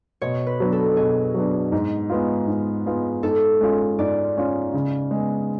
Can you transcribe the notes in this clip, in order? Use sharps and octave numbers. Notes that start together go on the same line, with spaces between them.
B2 C#5
B4
F#3 B3 D4
A4
B2 G#4
F#3 B3 D4
G#2
G#3 B3 F4
G#2
G#3 B3 F4
G#2 A4
G#3 C#4 F4
G#2 D5
G#3 C#4 F4
C#3
G#3
B3